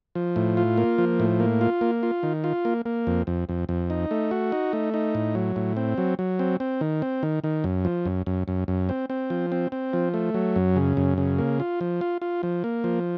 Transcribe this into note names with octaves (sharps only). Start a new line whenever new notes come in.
F3
A2
F4
A#3
F3
A2
A#3
F4
A#3
F4
D#3
F4
A#3
A#3
F2
F2
F2
F2
D#4
A3
F#4
D#4
A3
D#4
A2
F#3
A2
C4
F#3
F#3
C4
C4
D#3
C4
D#3
D#3
F#2
F3
F#2
F#2
F#2
F#2
C4
C4
F3
C4
C4
F3
A3
F#3
F#2
C#3
F#2
C#3
A#3
F4
F3
F4
F4
F3
A#3
F3